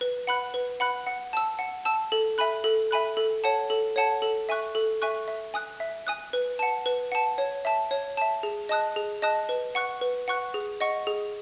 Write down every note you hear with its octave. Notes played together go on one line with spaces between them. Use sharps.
B4
F#5 B5 F#6
B4
F#5 B5 F#6
F#5
A5 E6
F#5
A5 E6
A4
E5 G#5 B5 F#6
A4
E5 G#5 B5 F#6
A4
C#5 F#5 A5
A4
C#5 F#5 A5
A4
E5 G#5 C#6 F#6
A4
E5 G#5 C#6 F#6
E5
G#5 D#6 F#6
E5
G#5 D#6 F#6
B4
F#5 A5
B4
F#5 A5
C#5
E5 A5
C#5
E5 A5
G#4
D#5 A5 D#6 F#6
G#4
D#5 A5 D#6 F#6
B4
F#5 C#6 F#6
B4
F#5 C#6 F#6
G#4
D#5 F#5 C#6
G#4